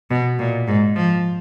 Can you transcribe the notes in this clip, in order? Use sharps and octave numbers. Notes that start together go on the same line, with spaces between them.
B2
A#2
G#2
F3